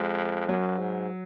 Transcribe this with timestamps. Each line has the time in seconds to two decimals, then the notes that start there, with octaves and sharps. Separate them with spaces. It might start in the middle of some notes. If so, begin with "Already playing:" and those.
Already playing: F2 G#3
0.49 F#2 F#3
0.78 G#2